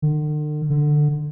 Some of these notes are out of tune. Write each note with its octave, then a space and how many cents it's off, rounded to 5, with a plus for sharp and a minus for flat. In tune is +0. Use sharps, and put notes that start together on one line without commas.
D3 +45
D3 +15